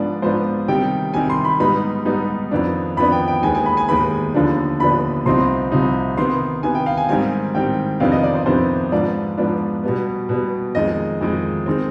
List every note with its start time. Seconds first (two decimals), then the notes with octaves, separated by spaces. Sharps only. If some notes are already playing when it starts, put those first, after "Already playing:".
Already playing: G#2 F3 B3 D4 D5
0.22 G#2 F3 B3 D4 C5
0.68 C3 D#3 G3 G5
1.14 C3 D#3 G3 G#5
1.30 C6
1.45 B5
1.60 G#2 G3 B3 D#4 B5
2.05 G#2 G3 B3 D#4
2.51 F2 D#3 B3 D4
2.97 F2 D#3 B3 D4 B5
3.12 G5
3.28 G5
3.43 D#2 D#3 G#3 B3 G#5
3.55 G#5
3.66 B5
3.77 G#5
3.88 D#2 D#3 G#3 B3 B5
4.34 D#2 D3 F3 B3 D4
4.80 D#2 D3 F3 B3 D4 B5
5.26 C2 C3 F3 C4 D#4 C6
5.72 C2 C3 F3 C4 D#4
6.17 C3 D#3 B3 C6
6.63 C3 D#3 B3 G#5
6.75 G5
6.86 F5
6.97 G#5
7.09 G#2 D#3 G3 C4 G#5
7.55 G#2 D#3 G3 C4 G5
8.00 F2 C3 D#3 B3 D4 F5
8.12 D#5
8.23 D5
8.35 C5
8.46 F2 C3 D#3 B3 D4 C5
8.92 G#2 F3 B3 D4 D5
9.38 G#2 F3 B3 D4
9.83 B2 G3 B3
10.29 B2 G3 B3
10.75 F2 D#3 G#3 D#5
11.21 F2 D#3 G#3
11.66 D#3 G#3 C4